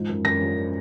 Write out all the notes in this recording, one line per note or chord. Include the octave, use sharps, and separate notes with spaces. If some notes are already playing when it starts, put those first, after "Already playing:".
Already playing: G#2 F3
F#2
F#2 A#6
F3